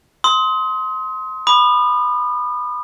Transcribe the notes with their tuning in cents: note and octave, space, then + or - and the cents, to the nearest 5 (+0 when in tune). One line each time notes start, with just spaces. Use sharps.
C6 +0 D#6 +35
B5 +0 D#6 -40